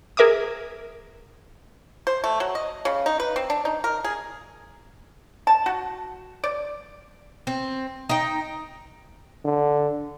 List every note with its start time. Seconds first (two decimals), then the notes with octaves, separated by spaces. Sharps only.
0.17 G#4 A#4 E5 D6 D#6
2.07 C5
2.24 A3
2.40 F#3
2.55 D#5
2.85 C#3
3.06 D#4
3.20 B4
3.36 C4
3.50 D4
3.65 D#4
3.84 A#4
4.04 G#4
5.47 A5
5.66 F#4
6.44 D5
7.47 C4
8.09 D#4 G5
9.45 D3